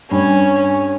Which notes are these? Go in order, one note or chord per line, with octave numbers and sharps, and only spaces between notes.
G2 C#4